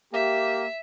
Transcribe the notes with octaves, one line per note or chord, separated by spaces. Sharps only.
A#3 G4 E5